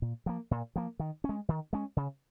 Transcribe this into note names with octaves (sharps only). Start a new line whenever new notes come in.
A#2
F3 A#3
A#2
F3 A#3
D#3
C#4
G#3
D#3
G#3 C#4
C#3